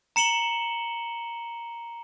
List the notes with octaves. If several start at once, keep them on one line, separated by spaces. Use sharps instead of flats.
A#5 C#7 E7 F#7 G7